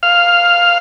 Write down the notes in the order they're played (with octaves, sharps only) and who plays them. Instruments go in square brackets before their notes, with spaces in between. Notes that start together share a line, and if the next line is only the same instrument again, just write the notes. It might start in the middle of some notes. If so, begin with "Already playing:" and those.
[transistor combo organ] F5